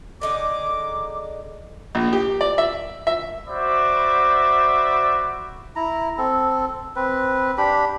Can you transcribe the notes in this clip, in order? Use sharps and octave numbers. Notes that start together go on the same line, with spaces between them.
D3 D#4 G#4 D6
A#1
G4
D5
E5
E5
F#4 C5 D5 E5 B5 D6
E4 A#5
C4 A4
C4 B4
D4 G4 B5